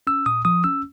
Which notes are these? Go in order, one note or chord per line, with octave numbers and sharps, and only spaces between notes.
C#4 E6
A#2 D#6
F3 D#6
C#4 E6